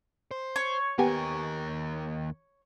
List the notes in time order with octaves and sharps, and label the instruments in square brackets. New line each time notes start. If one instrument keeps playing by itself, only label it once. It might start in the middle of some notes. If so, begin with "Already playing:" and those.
[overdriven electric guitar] C5
[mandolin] C#5
[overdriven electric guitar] D#2 A#4 [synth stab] B3 G4 G#5